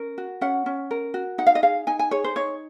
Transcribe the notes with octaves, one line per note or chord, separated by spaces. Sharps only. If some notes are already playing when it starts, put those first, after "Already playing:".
Already playing: C#4 A#4
F#4
C#4 F#5
C#4
A#4
F#4
D#4 F#5
F5
D#5
G#4 F5
D#4 G#5
G#5
G#4 C#5
C5
D#4 C#5